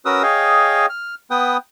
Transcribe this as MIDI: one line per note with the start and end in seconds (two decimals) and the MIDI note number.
0.06 0.23 61
0.06 0.23 66
0.06 0.23 70
0.06 0.23 71
0.06 0.23 87
0.06 0.23 88
0.23 0.86 68
0.23 0.86 73
0.23 0.86 75
0.23 0.86 77
0.23 0.86 79
0.90 1.15 89
1.31 1.57 59
1.31 1.57 71
1.31 1.57 79
1.31 1.57 87